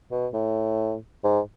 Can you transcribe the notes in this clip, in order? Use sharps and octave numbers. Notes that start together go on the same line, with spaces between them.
B2
A2
G#2